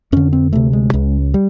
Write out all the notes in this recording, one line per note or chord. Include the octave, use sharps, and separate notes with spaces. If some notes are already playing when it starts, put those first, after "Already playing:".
F2 D3 C#4
C4
D2 C3 A3
G#3
C#2 C#3
G3